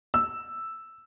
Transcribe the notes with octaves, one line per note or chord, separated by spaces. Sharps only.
E6